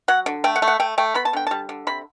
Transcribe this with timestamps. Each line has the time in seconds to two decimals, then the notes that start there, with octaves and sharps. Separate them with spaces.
0.08 F#3 F#5
0.26 D3
0.44 A3 G5
0.56 F#5
0.62 A3
0.68 F#5
0.80 A3 G5
0.98 A3 G5
1.15 B3 B5
1.25 A5
1.33 D3 G5
1.47 G3 A5
1.69 D3
1.87 C3 B5